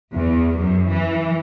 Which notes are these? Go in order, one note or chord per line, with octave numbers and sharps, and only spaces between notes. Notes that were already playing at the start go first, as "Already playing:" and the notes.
E2
F#2
E3